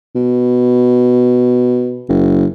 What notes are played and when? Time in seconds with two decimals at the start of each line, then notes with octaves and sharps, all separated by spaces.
0.15 B2
2.08 F#1